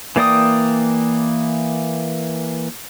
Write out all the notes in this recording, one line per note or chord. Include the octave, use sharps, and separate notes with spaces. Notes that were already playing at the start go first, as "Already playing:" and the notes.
E3 A#3 D5 G5 D#6